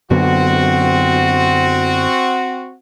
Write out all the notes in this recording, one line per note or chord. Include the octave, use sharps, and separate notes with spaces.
F#2 D3 B3 C4 F#4